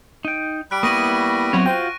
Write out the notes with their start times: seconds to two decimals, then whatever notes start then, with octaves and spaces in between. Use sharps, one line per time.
0.25 D#4 G5
0.71 G3 B5 F#6 D7
0.83 A#3 B3 E4 C#6 D#6 A#6 D#7
1.53 F#3 B3 C4 E4 F#4 C#5
1.66 F4 F#4 C5 G5